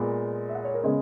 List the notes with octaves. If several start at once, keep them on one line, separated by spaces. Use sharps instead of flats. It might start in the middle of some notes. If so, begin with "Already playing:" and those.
Already playing: A#2 G#3 B3
E5
F#5
C#5
A#4
C#3 G#3 B3 D#5